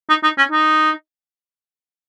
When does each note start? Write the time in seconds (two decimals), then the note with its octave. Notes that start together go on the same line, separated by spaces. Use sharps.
0.09 D#4
0.23 D#4
0.38 C#4
0.51 D#4